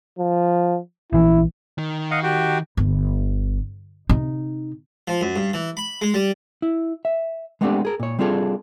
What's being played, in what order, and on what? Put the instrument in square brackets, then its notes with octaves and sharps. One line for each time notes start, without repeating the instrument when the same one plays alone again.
[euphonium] F3
[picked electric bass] A#1 E3 [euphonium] E4
[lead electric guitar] D#3
[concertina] D#5 F5 F#5
F#4 G4
[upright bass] G1
C3 D#4
[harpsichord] F3
F#2
G2
E3
B5
G#3
G3
[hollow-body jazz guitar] E4
E5
G#3 A3 B3 C4 D4 G4
G#4 A#4
A#2 C#5
G3 C4 D4 F4 G#4 A4